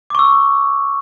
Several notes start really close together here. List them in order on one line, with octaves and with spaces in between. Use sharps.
D6 C#6 E6